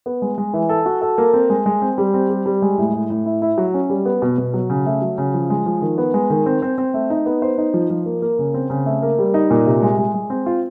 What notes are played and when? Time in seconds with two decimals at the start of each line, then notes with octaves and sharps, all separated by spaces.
0.06 B3
0.22 G#3
0.38 G#3
0.53 E3
0.69 A4
0.86 F#4
1.01 A4
1.18 A#3
1.34 C4
1.50 G#3
1.66 G#3
1.82 C4
1.98 G3
2.14 C4
2.30 G3
2.46 G3
2.62 G#3
2.78 A2
2.93 A2
3.10 A2
3.26 E4
3.42 E4
3.58 F#3
3.74 C#4
3.90 G3
4.06 B3
4.22 B2
4.38 B2
4.54 F#3
4.70 C#3
4.86 A3
5.02 F#3
5.18 C#3
5.34 F3
5.50 G#3
5.66 F3
5.82 D#3
5.98 B3
6.14 G#3
6.30 D#3
6.46 C4
6.62 C4
6.78 C4
6.94 A3
7.10 D#4
7.26 B3
7.42 C5
7.58 D#4
7.74 F3
7.90 F3
8.06 A#3
8.22 A#3
8.39 C#3
8.54 C4
8.70 C#3
8.86 A3
9.02 A#3
9.19 G3
9.34 D#4
9.50 A#2
9.66 C3
9.82 G#3
9.98 G#3
10.14 G#3
10.30 C4
10.46 F4